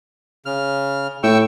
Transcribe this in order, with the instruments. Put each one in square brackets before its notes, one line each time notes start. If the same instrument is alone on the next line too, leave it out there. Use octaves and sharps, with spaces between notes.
[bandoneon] C#3 F6
[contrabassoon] A2 [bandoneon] G5 C#6 E6